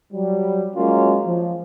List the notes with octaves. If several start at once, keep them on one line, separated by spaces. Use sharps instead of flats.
F#3 G3
F#3 G#3 A#3 C#4 F4
F3